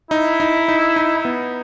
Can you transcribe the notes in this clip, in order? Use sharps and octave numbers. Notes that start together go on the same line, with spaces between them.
D#4 E4
D#4
D#4
D#4
B3